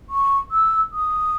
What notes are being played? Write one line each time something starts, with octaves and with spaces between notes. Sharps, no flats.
C#6
E6
D#6